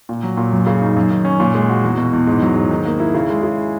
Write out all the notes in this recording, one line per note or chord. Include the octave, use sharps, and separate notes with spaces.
A#2
F#3
A#2
F#2
C#3
D#4
F#2
D#3
C#4
A#2
G#3
F#4
E2
B2
E2
G#2
F#3
G#2
D#3
A#3
E4
C#3
G#3
C#3